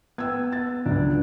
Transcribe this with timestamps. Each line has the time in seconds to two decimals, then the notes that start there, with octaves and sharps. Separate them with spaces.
0.18 B3 G5 E6 G#6
0.52 A6
0.86 C#2 F#3 D4